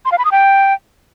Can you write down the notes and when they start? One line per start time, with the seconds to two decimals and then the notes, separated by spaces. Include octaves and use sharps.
0.05 C6
0.12 F5
0.18 B5
0.25 D#6
0.32 G5